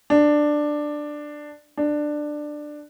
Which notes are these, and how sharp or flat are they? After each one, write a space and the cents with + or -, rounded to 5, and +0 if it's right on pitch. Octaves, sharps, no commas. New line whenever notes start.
D4 +10
D4 +15